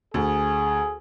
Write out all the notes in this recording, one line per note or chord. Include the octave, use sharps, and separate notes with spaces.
D2 G#4